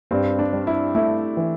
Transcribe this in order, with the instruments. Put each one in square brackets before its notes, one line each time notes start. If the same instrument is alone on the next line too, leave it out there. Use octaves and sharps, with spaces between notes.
[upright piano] G2 [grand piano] C4
[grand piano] D4
[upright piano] G3
[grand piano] E4
[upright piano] A3 [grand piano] E4
[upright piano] E3